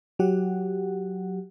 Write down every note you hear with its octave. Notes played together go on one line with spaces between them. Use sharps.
F#3 G4 F#5